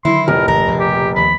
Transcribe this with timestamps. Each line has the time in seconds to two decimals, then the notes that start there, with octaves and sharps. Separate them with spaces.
0.05 D3 D#3 F#3 E4 C6
0.28 F1 A2 A#4
0.48 G#1 A#4 A#5
0.68 A#1 C#3
0.80 G4
1.16 D#2 F3 B5